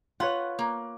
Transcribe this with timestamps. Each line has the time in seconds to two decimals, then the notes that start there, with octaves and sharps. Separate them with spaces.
0.20 F4 B4 C#5 F#5
0.59 A#3